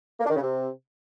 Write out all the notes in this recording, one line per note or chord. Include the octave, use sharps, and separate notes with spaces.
A#3
D4
D#3
C#3
C3